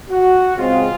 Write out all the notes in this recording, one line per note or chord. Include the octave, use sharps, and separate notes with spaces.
F#4
C#3 G#3 C4 F4